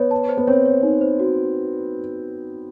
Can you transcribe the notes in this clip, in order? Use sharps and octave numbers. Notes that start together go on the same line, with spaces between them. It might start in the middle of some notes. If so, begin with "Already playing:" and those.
Already playing: B3 C#5
A5
C5
B3
C4 C#5
C#5
D#4
C5
F#4